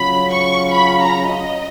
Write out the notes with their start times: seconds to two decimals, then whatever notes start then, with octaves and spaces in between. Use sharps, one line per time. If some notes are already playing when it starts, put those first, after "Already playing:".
Already playing: C#3 F#3 C#4 F4 B5
0.31 C#6
0.73 B5
1.01 A#5
1.29 D#5